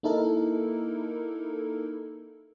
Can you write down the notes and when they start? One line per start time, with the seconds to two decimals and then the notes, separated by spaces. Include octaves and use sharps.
0.03 A#3 D#4 E4 A4 A#4